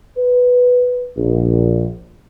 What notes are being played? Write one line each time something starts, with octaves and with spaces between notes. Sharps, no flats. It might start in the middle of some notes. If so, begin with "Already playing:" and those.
B4
A#1